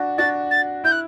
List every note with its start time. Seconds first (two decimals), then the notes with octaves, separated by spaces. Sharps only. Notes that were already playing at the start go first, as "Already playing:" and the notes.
Already playing: D4 F#4
0.18 D4 F#4 A6
0.51 A6
0.84 E4 G6
0.92 F#6